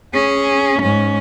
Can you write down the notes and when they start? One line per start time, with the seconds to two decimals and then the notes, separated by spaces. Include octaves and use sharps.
0.13 C#4 G#4
0.82 G#2 C#4